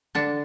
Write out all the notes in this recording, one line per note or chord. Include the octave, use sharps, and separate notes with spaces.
D3 D4